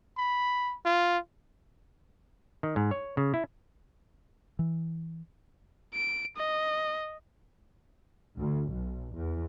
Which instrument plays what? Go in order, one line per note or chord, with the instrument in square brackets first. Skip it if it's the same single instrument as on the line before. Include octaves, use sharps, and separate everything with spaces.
[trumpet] B5
F4
[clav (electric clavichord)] D#3
G#2
C#5
C#3
E4
[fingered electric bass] E3
[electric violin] D7
D#5
[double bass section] D2
B1
E2